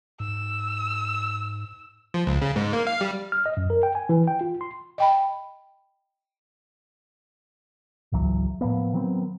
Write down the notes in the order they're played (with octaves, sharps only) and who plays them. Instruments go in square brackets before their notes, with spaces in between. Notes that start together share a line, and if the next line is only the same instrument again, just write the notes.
[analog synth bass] G#2 [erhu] E6
[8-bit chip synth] F3
C#2
C#3
G#2
A#3
F5
G3
[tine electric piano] F6
D#5
F#2
A#4
G5
G#5
E3
G5
F4
C6
[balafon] D#5 G5 B5
[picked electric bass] G#1 C#2 E3 F#3
A2 F3 A#3 B3
D#3 F#3 B3 C4